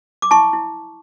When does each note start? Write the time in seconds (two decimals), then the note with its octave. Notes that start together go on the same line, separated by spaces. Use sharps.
0.22 D6
0.31 E4 A5 C#6
0.53 E4